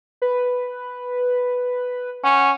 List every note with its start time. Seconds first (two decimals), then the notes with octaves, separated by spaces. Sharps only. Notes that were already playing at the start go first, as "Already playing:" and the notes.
0.22 B4
2.24 C#4 F#5